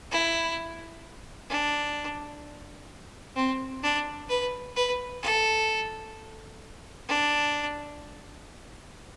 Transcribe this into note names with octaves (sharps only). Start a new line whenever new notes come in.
E4
D4
C4
D4
B4
B4
A4
D4